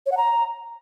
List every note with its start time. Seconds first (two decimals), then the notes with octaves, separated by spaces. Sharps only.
0.06 C#5
0.12 F#5
0.17 A#5